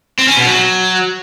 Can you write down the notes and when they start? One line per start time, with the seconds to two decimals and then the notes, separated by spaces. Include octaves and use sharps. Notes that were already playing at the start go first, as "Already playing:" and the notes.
0.18 C4
0.28 C#4
0.37 B2
0.46 F#3